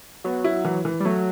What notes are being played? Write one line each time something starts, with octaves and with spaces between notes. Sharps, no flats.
F#3 B3
E4
E3
E3
G3
F#3 A3